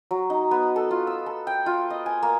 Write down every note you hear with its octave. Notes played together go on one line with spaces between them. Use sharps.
F#3
D#4
B3
A4
F4
E6
A4
G5
F4
D#5
G#5
A#3